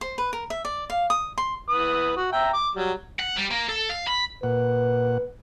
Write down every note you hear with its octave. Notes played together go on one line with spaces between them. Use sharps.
C5
B4
A#4
E5
D5
F5
D#6
C6
E3 B4 D#6
F#4
E5 G5 A#5
D6
F#3 G3
F#5
G3
A#3
A4
F5
B5
A#2 B4 F#5